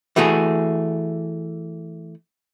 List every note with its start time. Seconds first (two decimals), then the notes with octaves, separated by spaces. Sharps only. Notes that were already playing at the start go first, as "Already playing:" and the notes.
0.16 E3 A3 F#4 G#4